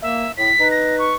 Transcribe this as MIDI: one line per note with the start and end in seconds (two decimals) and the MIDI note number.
0.02 0.25 58
0.02 0.32 76
0.37 0.50 45
0.37 0.70 95
0.58 1.14 63
0.58 1.14 71
0.71 0.98 94
0.99 1.15 85